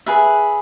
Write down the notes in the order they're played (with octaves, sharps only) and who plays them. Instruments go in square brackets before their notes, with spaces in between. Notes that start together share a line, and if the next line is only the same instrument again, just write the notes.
[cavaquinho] G#4 B4 E5